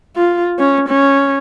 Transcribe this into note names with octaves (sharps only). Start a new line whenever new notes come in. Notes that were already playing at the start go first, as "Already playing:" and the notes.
F4
C#4
C#4